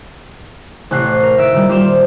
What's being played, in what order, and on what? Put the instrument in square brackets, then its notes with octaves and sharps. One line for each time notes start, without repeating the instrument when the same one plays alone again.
[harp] A1 C3 F#6 C7 C#7
A#4
D#3 E5 E6 D7
A#2 D#3 G3
G3 F4 C5 D6 E7